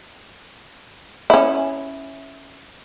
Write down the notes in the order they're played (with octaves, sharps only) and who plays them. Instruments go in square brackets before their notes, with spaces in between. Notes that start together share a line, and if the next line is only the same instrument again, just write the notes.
[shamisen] C#4 E4